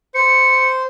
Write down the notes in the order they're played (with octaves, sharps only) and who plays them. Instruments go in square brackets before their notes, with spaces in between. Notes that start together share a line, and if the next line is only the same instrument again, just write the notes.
[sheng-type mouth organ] C5 [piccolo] C#7